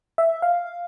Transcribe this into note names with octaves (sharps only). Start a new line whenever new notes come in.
E5
F5